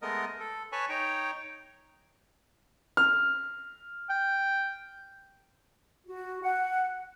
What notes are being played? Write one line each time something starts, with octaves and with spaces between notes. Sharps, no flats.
G#3 A3 B3 A#4 D#5
A4
B4 C#5 G#5 A5 B5 C#6
D#4 C#5 G5 A#5
F6
G5
F#4
F#5